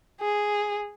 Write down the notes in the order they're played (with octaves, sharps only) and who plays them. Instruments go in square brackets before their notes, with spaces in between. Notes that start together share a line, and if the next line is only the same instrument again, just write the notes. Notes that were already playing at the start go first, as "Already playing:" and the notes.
[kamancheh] G#4